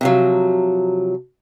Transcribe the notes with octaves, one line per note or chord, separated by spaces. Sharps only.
C3 F3 F#3